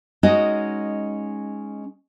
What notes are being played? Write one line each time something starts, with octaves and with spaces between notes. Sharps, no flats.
G#3 C#4 D#4 F#4 D#5